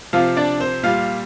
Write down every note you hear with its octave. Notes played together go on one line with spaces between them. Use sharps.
C3 F3 F4 F5
D4 D5
C4 C5
A#2 G3 F4 F5